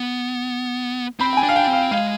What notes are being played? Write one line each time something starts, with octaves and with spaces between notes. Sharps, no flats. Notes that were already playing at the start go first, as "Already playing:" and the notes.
Already playing: B3
C4 B5
G5
G#5
D4
F5
G5
C4
F5
G#3 F5